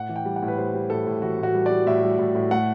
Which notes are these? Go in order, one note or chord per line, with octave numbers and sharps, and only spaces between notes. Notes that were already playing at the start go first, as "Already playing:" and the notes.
Already playing: A2 F#5
E3
G5
G3
F#5
A2
B4
G3 C5
G3
A2 A4
A2
E3 F#4
A2 F#4
G3
G3 D5
A2 E5
G3
A2
A2
A3 F#5